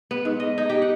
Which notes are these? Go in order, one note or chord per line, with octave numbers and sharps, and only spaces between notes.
B3
G#2
D#5
D#4
G4
F#5